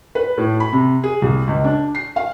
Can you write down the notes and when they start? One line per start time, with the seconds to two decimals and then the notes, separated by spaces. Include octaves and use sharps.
0.15 B4
0.38 A2
0.60 B5
0.72 C3
1.04 G#4
1.22 C2
1.47 C#2
1.64 D4
1.95 C7
2.16 F5